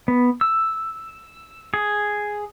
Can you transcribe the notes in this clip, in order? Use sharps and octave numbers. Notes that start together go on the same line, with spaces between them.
B3
E6
G#4